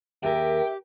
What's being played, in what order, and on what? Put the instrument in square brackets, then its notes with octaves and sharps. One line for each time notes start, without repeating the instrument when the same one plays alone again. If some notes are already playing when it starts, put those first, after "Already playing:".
[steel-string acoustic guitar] D#2 G#4 A#4 [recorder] G4 [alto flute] E5 [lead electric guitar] G5